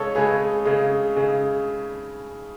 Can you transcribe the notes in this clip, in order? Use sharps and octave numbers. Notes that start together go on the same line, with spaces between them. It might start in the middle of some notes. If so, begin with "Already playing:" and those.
Already playing: C#3 G#3 A4 C#5
C#3 G#3 G#4 B4
C#3 G#3
C#3 G#3